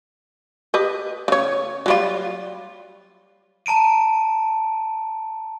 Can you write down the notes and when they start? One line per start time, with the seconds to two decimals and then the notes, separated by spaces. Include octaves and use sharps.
0.74 G4 B4 D#5
1.28 C#3 C#5
1.86 F#3 G3 F4
3.66 A5 A#5 D7 D#7